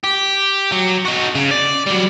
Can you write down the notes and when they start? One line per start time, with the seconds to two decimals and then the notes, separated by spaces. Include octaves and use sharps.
0.04 G4
0.72 F#3
1.05 D#4 F#4
1.35 C#3
1.51 D5
1.87 F#3 G3